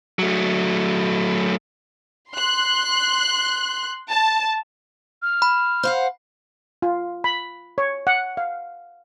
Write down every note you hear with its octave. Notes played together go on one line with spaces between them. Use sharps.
F#3 A3
C6 F#6
A5
F6
B5
C5 F5 F#5
F4
B5
C#5
F#5
F5